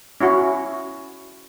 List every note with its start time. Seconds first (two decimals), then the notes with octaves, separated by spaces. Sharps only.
0.21 C#4 E4 F#4